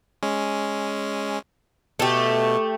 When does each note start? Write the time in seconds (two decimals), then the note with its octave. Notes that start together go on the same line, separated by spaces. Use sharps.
0.23 G#3 C#4
2.00 B2 A3 G4